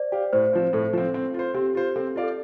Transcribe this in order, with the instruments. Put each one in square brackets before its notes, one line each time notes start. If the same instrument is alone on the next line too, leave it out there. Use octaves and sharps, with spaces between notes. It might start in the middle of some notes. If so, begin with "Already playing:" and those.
Already playing: [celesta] C5 D5
[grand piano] G4 F5
[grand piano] A2 [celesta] C5
[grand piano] F3 C4
[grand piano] A2 [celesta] A4
[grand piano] F3 C4
C4
F4 C5
[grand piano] C4 [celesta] G4
[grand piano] F4 C5
[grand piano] C4 [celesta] A4
[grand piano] F4 D5 F5
[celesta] A4